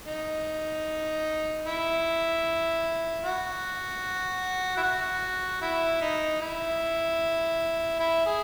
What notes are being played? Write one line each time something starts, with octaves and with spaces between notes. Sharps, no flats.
D#4
E4
F#4
E4
F#4
E4
D#4
E4
E4
G#4